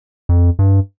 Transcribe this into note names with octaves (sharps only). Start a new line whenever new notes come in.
F2
G2